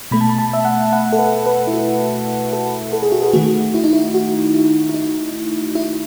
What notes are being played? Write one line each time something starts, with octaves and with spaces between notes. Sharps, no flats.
B2 A3 B5
A5
B5
A5
E5
F#5
F#5
A4
B4
B4
E4
F#4
A4
A4
G#4
F#4
G#4
D#3 A3 F#4
E4
D#4
E4
F#4
E4
E4
D#4
E4